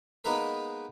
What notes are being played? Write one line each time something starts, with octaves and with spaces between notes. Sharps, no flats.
G#3 A#3 B3 D#4 A#4 B4